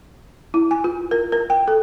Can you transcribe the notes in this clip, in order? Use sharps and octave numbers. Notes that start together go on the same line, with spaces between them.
E4
G#5
F4
A#4
A#4
G5
A4